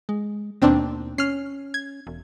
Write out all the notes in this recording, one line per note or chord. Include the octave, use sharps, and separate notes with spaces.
G#3
D#2 B2 C4 D4
C#4 F6 C7
G#6
E1